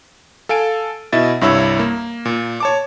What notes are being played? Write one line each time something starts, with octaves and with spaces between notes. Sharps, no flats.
A4 F5 G#5 D7
B2 E4 D#5 E5 A6
C2 G2 E4 C#5 E6
A#3
A#2
C#5 A5 D6